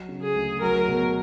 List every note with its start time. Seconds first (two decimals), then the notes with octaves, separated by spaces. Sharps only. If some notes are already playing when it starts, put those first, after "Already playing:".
Already playing: F#3
0.09 C#3
0.22 G#4
0.35 D2
0.62 F#3 A#4
0.88 B2